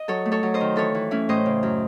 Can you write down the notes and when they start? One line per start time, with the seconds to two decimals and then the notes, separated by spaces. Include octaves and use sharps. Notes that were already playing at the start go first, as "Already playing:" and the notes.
Already playing: D#5
0.08 F#3 A4 C#5
0.26 A3
0.32 A4 C#5
0.43 F#3
0.54 C5 D#5
0.60 D#3
0.76 E3 A4 C#5
0.95 E3
1.11 A3 C#4 E4
1.29 A2 C5 D#5
1.46 C#3
1.63 F#2